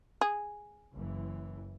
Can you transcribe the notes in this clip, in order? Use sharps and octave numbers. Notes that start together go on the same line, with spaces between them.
G#4
F#1 E3